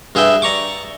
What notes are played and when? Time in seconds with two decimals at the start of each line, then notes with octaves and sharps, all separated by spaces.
0.15 G2 G#4 B4 E5 G5
0.42 D5 A#5 C#6 D6